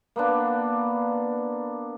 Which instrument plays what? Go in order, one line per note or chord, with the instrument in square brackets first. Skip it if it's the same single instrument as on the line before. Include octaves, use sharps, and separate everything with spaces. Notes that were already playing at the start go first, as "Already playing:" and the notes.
[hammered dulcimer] A#3 B3 D4